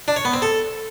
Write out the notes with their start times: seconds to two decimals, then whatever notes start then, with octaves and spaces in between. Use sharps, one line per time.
0.08 D4
0.16 C#5
0.25 B3
0.34 C4
0.42 A4